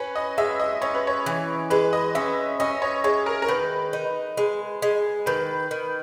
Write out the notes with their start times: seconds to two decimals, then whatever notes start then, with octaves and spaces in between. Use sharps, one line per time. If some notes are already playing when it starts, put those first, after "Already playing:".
Already playing: C#4 B4
0.16 D#5
0.38 G#3 E5
0.60 D#5
0.81 C#4 C#5
0.95 B4
1.07 C#5
1.26 E3
1.70 G#3 B4
1.93 D#5
2.15 C#4 E5
2.60 C#4 D#5
2.82 C#5
3.04 G#3 C#5
3.26 A#4
3.42 A#4
3.48 D#3 B4
3.93 D#4
4.37 G#3
4.82 G#3
5.26 D#3 B4
5.71 D#3